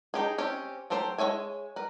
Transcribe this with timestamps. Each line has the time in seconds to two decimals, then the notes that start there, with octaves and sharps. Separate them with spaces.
0.14 D#4 G4 G#4
0.38 C4 C#4 G4
0.90 F#3 A3 G4 C5
1.18 G#3 A#4 C#5 E5 G#5
1.76 A#4 B4